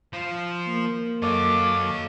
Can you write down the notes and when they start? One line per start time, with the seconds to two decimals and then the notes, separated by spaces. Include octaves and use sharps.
0.13 F3
0.68 A#3
1.22 F#2 A4 C#5 D#5 F5 D6